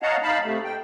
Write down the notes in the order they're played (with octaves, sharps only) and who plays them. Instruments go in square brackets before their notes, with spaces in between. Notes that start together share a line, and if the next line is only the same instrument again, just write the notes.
[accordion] C#5 D#5 F5 F#5 A5 A#5
D#4 F5 A5 B5
C3 A3
G5